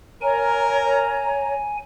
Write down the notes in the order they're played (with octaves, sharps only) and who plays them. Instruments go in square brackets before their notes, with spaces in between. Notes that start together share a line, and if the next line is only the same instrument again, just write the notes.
[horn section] A#4 [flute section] C#5 A#5 [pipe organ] G#5